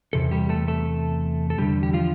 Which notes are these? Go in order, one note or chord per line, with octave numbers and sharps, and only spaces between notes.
E2 C3 A4
G3 G4
A3 A4
A3 A4
A4
E2 D3 G3 G4
G4
F3 F4